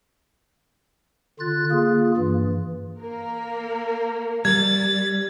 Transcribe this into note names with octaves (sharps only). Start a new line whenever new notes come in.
D3 F4 F#6 A6
A#3 F4 G#4
G2 E3
A#3 A#4
G3 G#6 A6